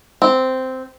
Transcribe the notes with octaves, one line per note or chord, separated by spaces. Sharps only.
C4